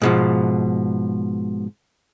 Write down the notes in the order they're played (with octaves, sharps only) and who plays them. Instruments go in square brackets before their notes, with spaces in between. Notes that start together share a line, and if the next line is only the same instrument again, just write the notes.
[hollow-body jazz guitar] G#2 B2 F3